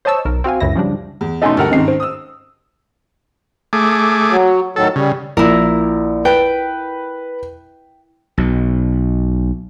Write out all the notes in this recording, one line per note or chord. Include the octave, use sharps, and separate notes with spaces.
C5 C#5 D#5 A5 C#6 E6
B1 A#4
C4 F#4 F5 G#5
C#2 F#2 C#3 E4 A#6
C#3 F3 G3 D4
E2
B2 A3 C#4 D#4 D#5 G#5 C6
D2 G3 A3 A4 A#4 F#5
G#2 D#3 C4 C#4 D#5 C7
C5
D#6 E6
A3 G#4 D6
F#3
A2 D#3 F#3 A4
C#3 G3
A#1 E4 A#4
B4 G5
B1 B2